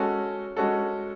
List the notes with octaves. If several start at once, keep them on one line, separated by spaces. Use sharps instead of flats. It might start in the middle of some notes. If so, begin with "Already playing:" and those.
Already playing: G#3 C#4 F#4 A4
G#3 C#4 F#4 A4